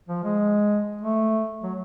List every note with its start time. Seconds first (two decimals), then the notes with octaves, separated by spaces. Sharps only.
0.09 F3
0.24 G#3
1.02 A3
1.63 F#3